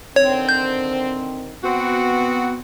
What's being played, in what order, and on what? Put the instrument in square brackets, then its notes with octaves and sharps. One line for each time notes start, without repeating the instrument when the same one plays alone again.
[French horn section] D3 D#3 C4 [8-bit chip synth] C#5
[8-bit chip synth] G6
[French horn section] B3 [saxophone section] C4 F#4